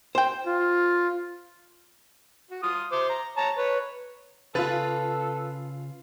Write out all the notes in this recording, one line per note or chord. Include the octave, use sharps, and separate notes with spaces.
C5 G5
F4
F#4
F4 D#6
C5 D6
A#5
C#5 A5 A#5
B4 C#5
C#3 F4 A4 B4 F5 A6